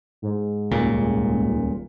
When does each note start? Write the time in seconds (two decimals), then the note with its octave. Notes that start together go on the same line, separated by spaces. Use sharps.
0.22 G#2
0.72 D#1 C#2 A#2